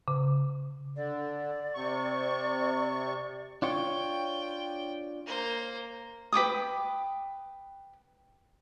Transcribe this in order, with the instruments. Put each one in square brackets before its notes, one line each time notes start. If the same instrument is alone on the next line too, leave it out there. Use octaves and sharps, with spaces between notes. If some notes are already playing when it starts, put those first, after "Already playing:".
[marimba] C#3
[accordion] D3 [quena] D5
[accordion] C3 C#6
[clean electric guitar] D4 F4 C#5 [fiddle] G5
[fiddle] A#3 C5
[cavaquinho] B4 G5 D6 D#6